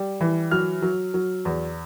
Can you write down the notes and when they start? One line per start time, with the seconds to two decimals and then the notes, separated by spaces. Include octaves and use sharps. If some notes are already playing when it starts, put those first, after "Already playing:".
Already playing: G3
0.21 E3
0.51 F#3 F6
0.82 F#3
1.14 F#3
1.45 E2